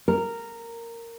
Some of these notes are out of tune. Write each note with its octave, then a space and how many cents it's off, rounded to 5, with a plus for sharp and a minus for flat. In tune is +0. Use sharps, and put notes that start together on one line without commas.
A#4 -10